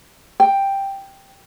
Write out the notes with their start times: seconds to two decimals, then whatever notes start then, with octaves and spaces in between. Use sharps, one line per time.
0.40 G5